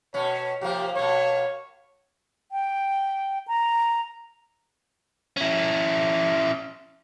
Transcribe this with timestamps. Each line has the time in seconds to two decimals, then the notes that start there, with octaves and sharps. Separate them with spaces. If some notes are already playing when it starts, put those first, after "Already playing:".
0.14 B2 C#4 C#5
0.61 C3 F3 A#3 G4
0.95 B2 A#3 C#5
2.52 G5
3.48 A#5
5.37 C#4 E4